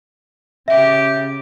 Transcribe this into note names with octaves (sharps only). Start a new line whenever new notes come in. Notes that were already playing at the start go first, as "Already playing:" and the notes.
C#3 G4 E5